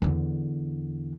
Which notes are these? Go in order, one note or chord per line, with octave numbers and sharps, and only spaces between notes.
E2 D3